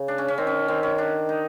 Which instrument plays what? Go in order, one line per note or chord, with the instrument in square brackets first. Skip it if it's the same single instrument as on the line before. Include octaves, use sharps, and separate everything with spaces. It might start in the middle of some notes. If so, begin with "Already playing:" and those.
Already playing: [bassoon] C#3
[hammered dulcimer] D4
C#4
C#4
[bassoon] D#3 [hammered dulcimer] C4
[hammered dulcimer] C#4
[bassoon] D#3 [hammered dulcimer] C4
[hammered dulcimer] C#4
D4
D#4